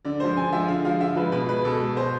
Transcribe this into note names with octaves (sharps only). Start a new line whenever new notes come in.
D3 D5
F3 G#3 C5
D3 G#5
F3 G#3 E5
D3 F5
F3 G#3 F5
D3 E5
F3 G#3 B4
B2 B4
G#3 B4
B2 A4
G#3
B2 C5